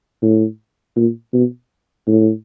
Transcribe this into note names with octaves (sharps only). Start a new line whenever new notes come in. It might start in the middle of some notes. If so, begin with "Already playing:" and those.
A2
A#2
B2
A2